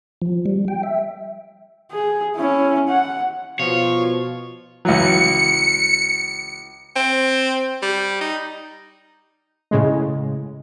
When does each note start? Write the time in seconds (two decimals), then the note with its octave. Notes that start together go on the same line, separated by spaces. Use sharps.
0.22 F3
0.46 G3
0.68 G5
0.83 E5
1.92 G#4
2.36 C#4 E4
2.88 F#5
3.59 B2 F3 F4 C#5
4.85 C#2 E3 F#3 C#7
6.96 C4
7.82 G3
8.21 D#4
9.71 A2 C#3 G#3